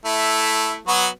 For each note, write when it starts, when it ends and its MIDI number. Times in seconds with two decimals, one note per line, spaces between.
0.05 0.80 57
0.05 0.80 64
0.88 1.08 54
0.88 1.08 59
0.88 1.08 66